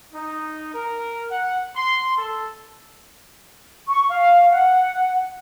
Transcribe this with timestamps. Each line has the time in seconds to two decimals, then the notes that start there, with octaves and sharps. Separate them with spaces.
0.14 D#4
0.74 A#4
1.30 F#5
1.76 C6
2.17 A4
3.88 C#6
4.09 F5
4.52 F#5